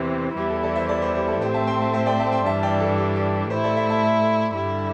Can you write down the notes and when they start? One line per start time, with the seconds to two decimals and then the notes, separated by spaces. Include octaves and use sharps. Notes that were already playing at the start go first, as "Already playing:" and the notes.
Already playing: E2 C3 E3 C4 G4 C5
0.36 E2 E3 G3 E4 G4
0.50 A4
0.63 A4 D5
0.76 C5 E5
0.89 A4 D5
1.01 G4 C5
1.15 G4 C5
1.28 A4
1.41 A2 A3 C4 G4 C5
1.54 E5 A5
1.67 G5 C6
1.81 E5 A5
1.93 C5 E5
2.06 D5 G5
2.20 E5 A5
2.32 G5 C6
2.45 G2 E3 G3 D4 E5 A5
2.63 D5 G5
2.80 A4
2.98 G4
3.16 G4
3.50 A2 A3 E4 G4 C5
3.64 A4 D5
3.76 C5 E5
3.89 E5 A5
4.55 G2 D3 G3 E4 G4